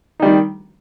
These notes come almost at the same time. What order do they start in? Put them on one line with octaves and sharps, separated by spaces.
D#4 G3 D#3